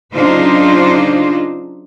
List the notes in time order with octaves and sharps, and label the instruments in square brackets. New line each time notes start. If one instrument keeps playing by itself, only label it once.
[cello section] C#3 F#3 D4 D#4 F4 C5